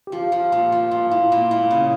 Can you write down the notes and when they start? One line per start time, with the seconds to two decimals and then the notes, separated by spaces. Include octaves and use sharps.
0.07 G4
0.12 F3 F4
0.32 F3 F4
0.52 A#2 F4
0.72 F3
0.91 A#2 F4
1.11 A#2 E4
1.32 A#2
1.50 A#2 E4
1.71 C#3